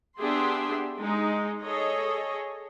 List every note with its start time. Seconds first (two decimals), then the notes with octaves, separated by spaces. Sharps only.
0.18 B3 D4 G4 G#4 E5 C6
0.99 G#3 D#4
1.62 G#4 A4 C#5 D#5